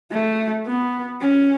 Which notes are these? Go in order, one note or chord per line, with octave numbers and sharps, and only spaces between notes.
A3
B3
C#4